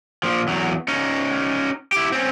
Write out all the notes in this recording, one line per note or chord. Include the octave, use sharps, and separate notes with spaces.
A#2 F3
E2 F#3
C#4 D#4
E4 G4
C4 C#4